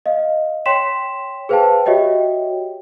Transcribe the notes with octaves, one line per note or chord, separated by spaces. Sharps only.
D#5 F5
C#5 G5 C6 B6 E7
G#4 B4 C5 F5 G5 A5
F#4 G4 C#5 D#5 E5 G5